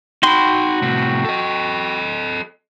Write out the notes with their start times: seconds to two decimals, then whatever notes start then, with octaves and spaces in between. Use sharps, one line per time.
0.23 D#4 F#4 G5 B5 C6
0.82 A2 C3
1.25 A4 D#5